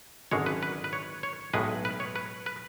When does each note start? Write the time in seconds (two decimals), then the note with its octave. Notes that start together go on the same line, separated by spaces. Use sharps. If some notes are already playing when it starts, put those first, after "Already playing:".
0.31 G#1 F#2 D3 G#3 C#5
0.46 B4
0.63 B4
0.84 B4
0.93 C#5
1.23 C#5
1.53 B1 A2 G#3 B4
1.85 B4
2.00 C#5
2.16 B4
2.46 B4